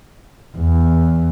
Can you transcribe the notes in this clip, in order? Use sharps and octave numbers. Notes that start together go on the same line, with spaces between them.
E2